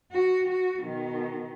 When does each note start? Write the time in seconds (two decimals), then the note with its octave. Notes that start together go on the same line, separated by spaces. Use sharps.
0.12 F#4
0.48 F#4
0.82 B2 D#3